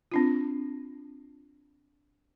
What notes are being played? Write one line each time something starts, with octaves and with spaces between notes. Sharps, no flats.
C4 D4 F4